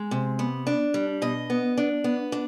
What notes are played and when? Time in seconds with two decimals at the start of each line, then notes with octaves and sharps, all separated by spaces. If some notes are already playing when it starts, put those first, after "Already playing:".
Already playing: G#3
0.11 C3
0.39 B3
0.67 D4
0.94 G3
1.22 B2 D#5
1.50 B3
1.78 D4
2.04 B3
2.32 D4